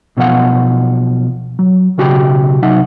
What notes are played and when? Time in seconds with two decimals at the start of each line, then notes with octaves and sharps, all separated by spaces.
0.17 B1 B2 F3 F5 F#5
1.59 F#3
1.98 B1 C#3 F#4 G4 G5 B5
2.62 C2 F#3 D#4 E5 F#5